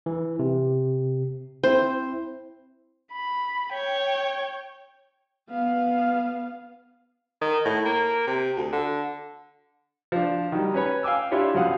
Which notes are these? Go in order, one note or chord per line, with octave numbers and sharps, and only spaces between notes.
E3
C3
C4 E4 C5
B5
C#5 G5
B3 F5
D#3
A2
A#3
C3
D2
D3
F3 D4
D#3 F#3 G3
C#4 B4 C#5 B5
F5 G5 G#5 D6 E6
D4 E4 F4 G4 C#5
F#2 B2 F3 F5 F#5 D#6